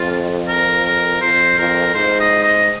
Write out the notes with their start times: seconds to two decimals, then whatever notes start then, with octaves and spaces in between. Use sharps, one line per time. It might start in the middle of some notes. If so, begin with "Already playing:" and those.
Already playing: F2 F4
0.48 A#4
0.85 A#4
1.21 F2 C5
1.58 F2 A#4
1.94 G#2 C5
2.20 D#5
2.43 D#5